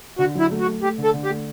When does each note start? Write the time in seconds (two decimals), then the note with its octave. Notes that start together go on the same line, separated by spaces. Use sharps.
0.19 D3 F#4
0.35 F#3 E4
0.51 A3
0.61 F#4
0.67 A3
0.83 A3 G4
0.98 D3
1.04 A4
1.14 D3
1.25 G4
1.29 A3